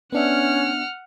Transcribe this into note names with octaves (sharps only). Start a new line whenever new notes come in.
B3 C#4 D4 E5 F#5 F6